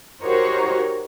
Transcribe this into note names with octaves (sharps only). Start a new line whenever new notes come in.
D#4 F#4 G4 A#4 C5 C#5